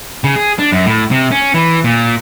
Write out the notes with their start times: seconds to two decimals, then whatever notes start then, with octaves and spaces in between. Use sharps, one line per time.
0.24 C#3
0.36 G#4
0.59 D4
0.72 F#2
0.86 A2
1.11 C3
1.31 C#4
1.54 E3
1.84 A#2